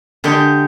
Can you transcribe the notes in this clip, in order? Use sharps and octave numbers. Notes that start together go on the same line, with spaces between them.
D3 G#3 G4